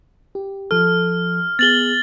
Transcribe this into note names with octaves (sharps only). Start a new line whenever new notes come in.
G4
F3 A4 F6
B3 G#4 A6 F#7 G7